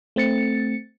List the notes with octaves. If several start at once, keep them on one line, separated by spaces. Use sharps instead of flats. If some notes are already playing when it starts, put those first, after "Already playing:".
A3 C4 A6 C#7